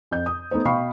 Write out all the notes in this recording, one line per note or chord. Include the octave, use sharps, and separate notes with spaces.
F2 G6
D#6
A3 B3 D#4 C5
B2 F5 G5 B5 C#6 C7